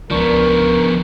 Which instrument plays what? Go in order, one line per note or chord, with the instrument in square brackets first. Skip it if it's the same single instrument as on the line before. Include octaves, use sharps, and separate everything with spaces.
[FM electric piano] C#2 D4 C#6 [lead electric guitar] F3 B3 [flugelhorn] A#4